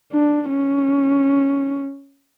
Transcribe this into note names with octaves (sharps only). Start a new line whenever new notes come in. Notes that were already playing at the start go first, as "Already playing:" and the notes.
D4
C#4